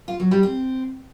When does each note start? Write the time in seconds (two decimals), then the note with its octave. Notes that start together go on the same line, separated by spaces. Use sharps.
0.08 F4
0.20 F#3
0.31 G3
0.43 C4